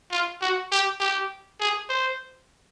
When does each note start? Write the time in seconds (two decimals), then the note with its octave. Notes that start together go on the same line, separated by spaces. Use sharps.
0.11 F4
0.42 F#4
0.71 G4
1.00 G4
1.60 G#4
1.89 C5